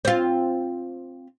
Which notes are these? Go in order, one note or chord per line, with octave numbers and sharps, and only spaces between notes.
C4 F4